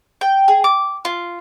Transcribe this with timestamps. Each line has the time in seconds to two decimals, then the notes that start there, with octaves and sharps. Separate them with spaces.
0.21 G5
0.48 G#4
0.64 D6
1.05 F4